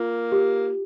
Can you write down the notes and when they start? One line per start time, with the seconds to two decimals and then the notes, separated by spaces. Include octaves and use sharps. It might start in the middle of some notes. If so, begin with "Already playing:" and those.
Already playing: A#3 F4
0.32 G4